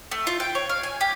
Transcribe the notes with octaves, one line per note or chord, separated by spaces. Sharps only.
A3
F4
G5
C#5
F5
G#5
G4